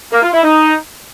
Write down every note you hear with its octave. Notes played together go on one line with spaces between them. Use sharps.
A#3
F4
E4
D#4